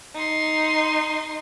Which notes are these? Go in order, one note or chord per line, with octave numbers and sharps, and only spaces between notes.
D#4 C6